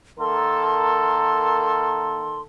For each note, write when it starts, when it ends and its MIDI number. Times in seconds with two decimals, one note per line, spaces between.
0.19 2.44 51
0.19 2.44 58
0.19 2.44 69
0.19 2.41 84